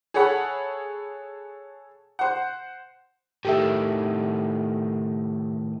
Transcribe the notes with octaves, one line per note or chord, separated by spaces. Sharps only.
G#4 A4 C#5 F#5 B5
C5 F#5
A2 D#3 G4 A4 E5